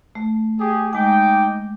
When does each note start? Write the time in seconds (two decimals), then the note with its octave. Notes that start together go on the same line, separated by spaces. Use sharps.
0.15 A3
0.59 G4 G#4
0.93 G#3 D#4 G5 G#5 D6